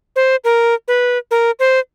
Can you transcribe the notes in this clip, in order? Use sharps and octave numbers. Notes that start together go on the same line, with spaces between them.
C5
A#4
B4
A#4
C5